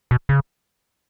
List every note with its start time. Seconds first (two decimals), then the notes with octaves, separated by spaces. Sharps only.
0.11 B2
0.29 C#3